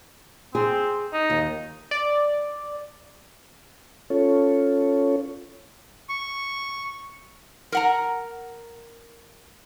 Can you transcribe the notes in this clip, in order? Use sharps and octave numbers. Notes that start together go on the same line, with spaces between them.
C4 G#4
D#4
D#2
D5
C#4 F4 A4 C#5
C#6
A#4 F#5 A#5